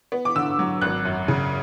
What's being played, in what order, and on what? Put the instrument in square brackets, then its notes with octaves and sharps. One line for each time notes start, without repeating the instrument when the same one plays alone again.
[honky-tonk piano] B3
D6
D3 E6
F#3
G#1 F#6
F#2
C#3